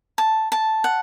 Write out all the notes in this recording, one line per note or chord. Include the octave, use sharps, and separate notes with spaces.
A5
A5
F#5